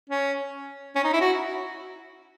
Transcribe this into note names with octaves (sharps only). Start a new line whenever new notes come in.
C#4
C#4
D#4
E4
F#4